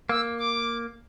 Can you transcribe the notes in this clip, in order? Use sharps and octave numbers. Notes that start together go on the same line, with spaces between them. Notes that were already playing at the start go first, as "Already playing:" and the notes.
A#3 E6
D6